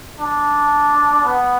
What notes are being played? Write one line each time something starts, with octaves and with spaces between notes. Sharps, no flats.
D4
B3